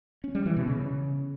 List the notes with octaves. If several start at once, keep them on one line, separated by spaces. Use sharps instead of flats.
C#4
G3
E3
B2
C#3